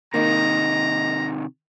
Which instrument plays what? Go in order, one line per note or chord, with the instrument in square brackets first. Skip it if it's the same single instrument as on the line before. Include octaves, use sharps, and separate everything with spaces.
[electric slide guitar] C3 D#3 [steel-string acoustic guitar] A#3 D#4 [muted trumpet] A#5